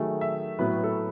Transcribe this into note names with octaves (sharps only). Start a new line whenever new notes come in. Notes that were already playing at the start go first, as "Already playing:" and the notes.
Already playing: D#3 F#3 A3 G#4
E5
A2 F#3 B3 B4
A4